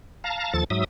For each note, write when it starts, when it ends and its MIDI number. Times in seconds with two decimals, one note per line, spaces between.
0.24 0.54 77
0.24 0.54 81
0.24 0.54 82
0.54 0.64 39
0.54 0.64 53
0.54 0.64 69
0.54 0.64 93
0.70 0.84 44
0.70 0.84 54
0.70 0.84 76
0.70 0.84 87